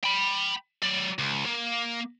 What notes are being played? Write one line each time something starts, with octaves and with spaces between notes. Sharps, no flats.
G5 B5
F#3 D5
C#2
A#3